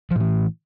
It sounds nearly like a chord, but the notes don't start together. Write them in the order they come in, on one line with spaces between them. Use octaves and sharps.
F3 A2 E3